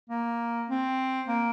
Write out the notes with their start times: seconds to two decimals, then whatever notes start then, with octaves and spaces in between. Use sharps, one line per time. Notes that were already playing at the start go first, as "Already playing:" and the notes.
0.10 A#3
0.69 C4
1.28 A#3